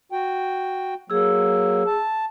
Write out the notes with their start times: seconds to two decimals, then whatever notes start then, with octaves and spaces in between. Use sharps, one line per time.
0.12 F#4 G5
1.10 F#3 A#3 G#4 E6
1.87 A5